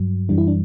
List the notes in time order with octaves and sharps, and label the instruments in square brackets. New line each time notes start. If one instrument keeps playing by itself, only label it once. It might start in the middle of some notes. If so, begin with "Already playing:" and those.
Already playing: [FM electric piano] G2 F#3
F#2 E3 G3 D4
E4
D4